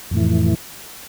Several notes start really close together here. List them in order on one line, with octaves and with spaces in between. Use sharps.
F2 A2 E3